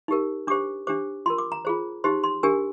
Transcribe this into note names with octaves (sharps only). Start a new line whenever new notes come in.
D#4 G4 A#4
D4 G4 C5 D6
D4 G4 C5 D6
F4 A#4 C6
D6
A#5
F4 G#4 C5
D#4 G4 C5 C6
C6
D4 G4 A#4 G#5